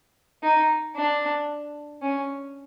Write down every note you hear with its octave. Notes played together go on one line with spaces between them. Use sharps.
D#4
D4
C#4